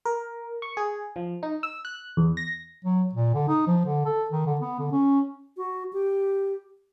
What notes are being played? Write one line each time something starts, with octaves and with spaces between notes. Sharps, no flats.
A#4
C#6
G#4
F3
D#4
E6
F#6
E2
A#6
F#3
A#2
D3
D#4
F3
D3
A4
D#3
D3
B3
D3
C#4
F#4
G4